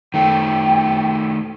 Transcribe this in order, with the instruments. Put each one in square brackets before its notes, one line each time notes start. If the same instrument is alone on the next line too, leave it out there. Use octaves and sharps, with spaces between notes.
[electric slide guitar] D#3 A3 [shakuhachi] G5